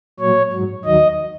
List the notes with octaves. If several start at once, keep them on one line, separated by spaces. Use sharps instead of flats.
A#2 F#3 C#5
G#2 F#3
D#2 D#3 F#3 D#5